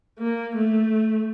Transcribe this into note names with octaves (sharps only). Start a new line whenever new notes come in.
A#3
A3